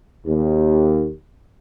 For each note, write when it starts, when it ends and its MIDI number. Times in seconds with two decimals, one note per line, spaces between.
0.26 1.09 39